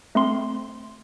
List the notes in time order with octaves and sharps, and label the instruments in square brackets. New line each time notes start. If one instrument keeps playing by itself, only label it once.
[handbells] A3 C4 C6